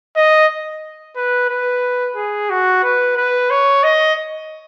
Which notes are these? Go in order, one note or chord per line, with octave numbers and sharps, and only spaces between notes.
D#5
B4
B4
G#4
F#4
B4
B4
C#5
D#5